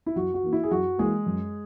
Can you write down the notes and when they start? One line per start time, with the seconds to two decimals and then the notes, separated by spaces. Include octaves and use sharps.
0.06 E4
0.16 F#2 F#4
0.34 F#4
0.43 E3 A#3
0.53 E4
0.63 G#4
0.71 F#2 F#4
0.98 E3 G#3 A#3 G#4
1.26 F#2